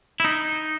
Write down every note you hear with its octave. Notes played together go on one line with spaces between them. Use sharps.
E4
D#4